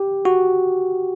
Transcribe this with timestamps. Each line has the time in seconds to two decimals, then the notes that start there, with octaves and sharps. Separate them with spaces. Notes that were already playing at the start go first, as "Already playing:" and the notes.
Already playing: G4
0.25 F#4